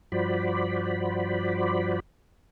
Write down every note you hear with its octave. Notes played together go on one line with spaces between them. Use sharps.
G2 F3 F#4 C5 D5 B5